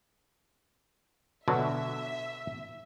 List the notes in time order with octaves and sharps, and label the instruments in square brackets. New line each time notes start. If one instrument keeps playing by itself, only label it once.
[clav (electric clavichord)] B2 D3 F#3 [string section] E5